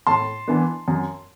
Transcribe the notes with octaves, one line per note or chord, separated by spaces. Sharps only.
A2 A5 C6
E3 B3 D4
F#2